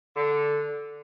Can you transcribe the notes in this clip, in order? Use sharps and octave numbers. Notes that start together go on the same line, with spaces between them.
D3